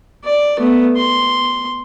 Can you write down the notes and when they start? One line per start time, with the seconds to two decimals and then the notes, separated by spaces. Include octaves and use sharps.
0.24 D5
0.59 A3 B3
0.97 C6